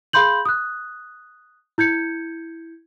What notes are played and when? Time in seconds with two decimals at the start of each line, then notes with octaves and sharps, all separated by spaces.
0.13 G#4 F5 B5 C6 G6 F#7
0.45 D#6 F#6
1.78 E4 G6 G#6 C#7